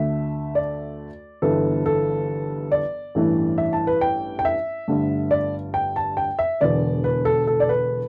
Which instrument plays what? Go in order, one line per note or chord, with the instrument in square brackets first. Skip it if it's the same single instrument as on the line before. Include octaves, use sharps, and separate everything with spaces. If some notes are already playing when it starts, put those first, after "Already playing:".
Already playing: [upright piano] D2 D3 A3 E5
D5
G1 G2 E3 B3 A4
A4
D5
A1 G2 E3 A3
E5
A5
B4
G5
G5
E5
G1 G2 D3 A3
D5
G5
A5
G5
E5
E1 E2 D3 B3 D5
B4
A4
A4
D5
B4